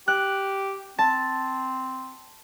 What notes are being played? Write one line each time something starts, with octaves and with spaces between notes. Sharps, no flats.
G4 F#6
C4 A5